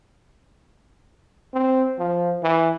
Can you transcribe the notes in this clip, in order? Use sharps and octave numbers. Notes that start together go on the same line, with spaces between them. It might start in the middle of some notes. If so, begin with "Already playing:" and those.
C4
F3
E3